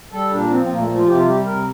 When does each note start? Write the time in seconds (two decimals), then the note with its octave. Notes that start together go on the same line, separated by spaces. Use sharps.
0.11 G3 A4
0.31 A#2 D4
0.50 F3 C4
0.63 C4
0.69 A#2 A#3
0.78 A3
0.89 F3 A3
0.97 F4
1.08 C3 G4
1.17 F4
1.26 G3 G4
1.45 C3 A#4